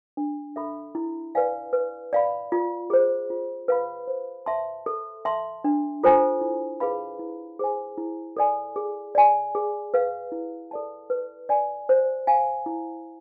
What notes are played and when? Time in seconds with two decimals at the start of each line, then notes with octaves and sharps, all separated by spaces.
0.17 D4
0.56 A4 E5 B5
0.95 E4
1.35 B4 D5 F5 G#5
1.73 B4
2.13 D5 F5 B5
2.52 F4
2.90 G#4 C5
3.30 F4
3.68 B4 F5 B5
4.08 C5
4.46 E5 A5 C6
4.86 A4
5.25 E5 A5 C6
5.64 D4
6.03 F4 A4 C5 G#5
6.41 E4
6.80 G#4 B4 F5 B5
7.19 E4
7.59 G#4 C5 G#5
7.98 E4
8.37 A4 D5 G#5
8.76 G#4
9.15 D5 G#5
9.55 G#4
9.94 B4 F5
10.32 E4
10.71 A4 D5 A5
11.10 B4
11.49 D5 G#5
11.89 C5
12.27 F5 G#5
12.66 E4